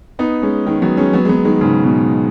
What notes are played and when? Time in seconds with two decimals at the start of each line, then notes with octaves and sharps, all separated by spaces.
0.19 B3 D#4
0.42 G#3 C#4
0.66 D#3 G#3
0.82 F#3 B3
0.97 G#3 C#4
1.13 F#3 B3
1.25 G#3
1.29 F#3 B3
1.45 D#3 G#3
1.61 G#2 C#3
1.84 B2